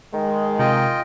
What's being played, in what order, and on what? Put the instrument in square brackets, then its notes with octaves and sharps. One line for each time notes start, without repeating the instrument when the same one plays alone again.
[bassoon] D#3 [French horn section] G#3
[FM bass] C3 [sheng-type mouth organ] F4 D#5 G5